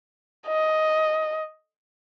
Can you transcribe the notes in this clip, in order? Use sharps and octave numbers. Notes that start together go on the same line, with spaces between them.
D#5